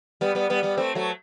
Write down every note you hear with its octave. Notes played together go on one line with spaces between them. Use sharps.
G3 B3
G3 B3
G3 B3
G3 B3
A3 C4
F#3 A3